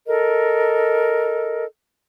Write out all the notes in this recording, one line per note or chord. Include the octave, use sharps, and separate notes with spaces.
A4 A#4 D#5